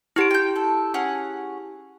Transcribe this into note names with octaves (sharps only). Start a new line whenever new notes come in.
C#4 E4 F#4 G4 D7
G5 G6
A4
C#4 G#4 F#5